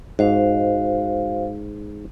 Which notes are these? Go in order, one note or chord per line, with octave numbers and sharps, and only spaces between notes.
G#2 F#4 C5 F5